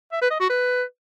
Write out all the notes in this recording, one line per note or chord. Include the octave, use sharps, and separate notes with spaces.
E5
B4
D#5
F#4
B4